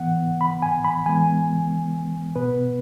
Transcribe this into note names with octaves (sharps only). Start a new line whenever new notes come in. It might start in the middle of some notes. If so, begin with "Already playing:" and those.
Already playing: E3 B3 F#5
B5
G#5
B5
E3 G#3 B3 G#5
B2 B3 B4